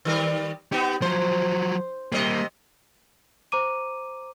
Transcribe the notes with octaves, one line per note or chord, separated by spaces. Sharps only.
D#3 G3 A#4
B3 D#4 G4
F3 F#3 C5
C3 G3 A#3 D#5
C5 A#5 D6 D#7